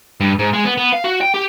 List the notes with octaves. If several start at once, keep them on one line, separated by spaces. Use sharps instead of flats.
G2
G#2
G#3
B3
B3
F5
F#4
G5
G4